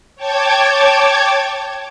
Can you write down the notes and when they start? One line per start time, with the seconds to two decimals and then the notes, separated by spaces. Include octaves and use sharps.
0.16 C#5 G5 A5 D6 G#6